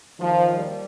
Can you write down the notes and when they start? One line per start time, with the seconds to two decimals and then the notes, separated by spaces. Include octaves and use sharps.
0.19 D#2 D#3 F3
0.55 G3